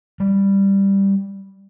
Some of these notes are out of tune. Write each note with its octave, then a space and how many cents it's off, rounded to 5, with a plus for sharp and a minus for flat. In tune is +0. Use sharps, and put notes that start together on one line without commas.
G3 +5